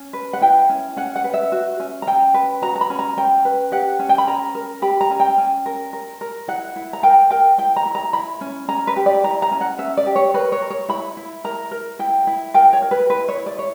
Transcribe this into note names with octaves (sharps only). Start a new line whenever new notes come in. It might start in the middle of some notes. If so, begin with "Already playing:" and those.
Already playing: C#4
B4
F#5
E4 G5
C#4
C#4 F#5
F#5
B4
E5
F#4
C#4
A#5
C#4 G5
B4
F#4 A#5
A#5
B5
C#4
A#5
C#4 G5
B4
G4 F#5
C#4
G5
B5
C#4 A#5
A#4
G4 B5
A#5
C#4
G5
C#4
A#4
A#4
A#4
E4 F#5
E4
A#5
A#4 G5
A#4 G5
E4 G5
A#5
E4
A#5
E4 B5
C#4
C#4 A#5
B4
G4
D5
E4 A#5
A#5
C#4
F#5
C#4 E5
D5
G4
C#5
A#4 B4
C#5
A#4
C#5
E4 B5
E4
A#4 A#5
A#4
E4 G5
E4
A#4 G5
C#5
A#4
B4
E4 B4
C#5
E4
D5
C#5